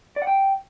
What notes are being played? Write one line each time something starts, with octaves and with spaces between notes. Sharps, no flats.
D5
F#5
G5